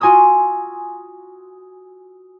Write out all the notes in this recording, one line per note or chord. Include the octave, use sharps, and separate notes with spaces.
F4 F#4 G#5 C6 D#6 E6